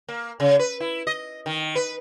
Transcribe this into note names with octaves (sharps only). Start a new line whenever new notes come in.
A#3
C#3
B4
E4
D#5
D#3
B4